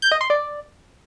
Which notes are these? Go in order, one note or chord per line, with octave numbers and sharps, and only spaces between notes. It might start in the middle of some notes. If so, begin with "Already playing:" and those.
G6
D#5
C6
D5